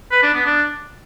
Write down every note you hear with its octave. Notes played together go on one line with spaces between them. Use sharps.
B4
D4
B3
D4